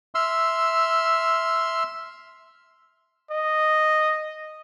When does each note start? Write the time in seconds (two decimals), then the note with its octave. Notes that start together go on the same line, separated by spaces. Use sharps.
0.15 E5 C6 E6 F6
3.31 D#5